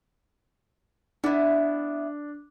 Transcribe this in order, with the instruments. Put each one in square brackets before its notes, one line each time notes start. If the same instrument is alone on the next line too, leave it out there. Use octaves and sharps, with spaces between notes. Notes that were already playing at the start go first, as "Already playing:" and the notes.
[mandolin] B3 E4 [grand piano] D4